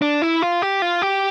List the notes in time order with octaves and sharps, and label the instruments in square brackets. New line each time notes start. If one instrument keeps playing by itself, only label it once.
[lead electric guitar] D4
E4
F4
G4
F4
G4